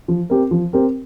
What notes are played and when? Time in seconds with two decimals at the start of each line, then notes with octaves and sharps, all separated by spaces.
0.08 F3
0.30 C4 G4 A#4
0.51 F3
0.73 C4 G4 A#4